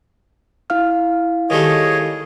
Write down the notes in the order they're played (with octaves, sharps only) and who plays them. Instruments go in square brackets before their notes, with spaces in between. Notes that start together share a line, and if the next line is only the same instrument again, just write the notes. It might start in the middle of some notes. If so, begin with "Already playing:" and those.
[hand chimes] E4 F5 F6
[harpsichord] D#3 G3 A3 [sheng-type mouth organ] G#4 C#5 D#5